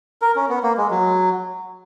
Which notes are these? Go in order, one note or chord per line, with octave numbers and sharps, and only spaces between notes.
A#4
C#4
B3
A#3
G#3
F#3